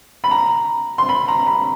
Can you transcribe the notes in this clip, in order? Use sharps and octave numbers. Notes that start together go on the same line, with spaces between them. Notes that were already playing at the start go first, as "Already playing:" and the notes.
B5
A#5
C6
B5
A#5
B5